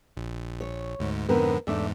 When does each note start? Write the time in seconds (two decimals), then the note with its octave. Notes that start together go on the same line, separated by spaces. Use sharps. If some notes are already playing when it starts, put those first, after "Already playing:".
0.17 A#1
0.61 C#5
0.99 D2 G#2
1.29 F2 G#2 D3 B3 C4 A#4
1.67 E2 G#2 A3 D4 E5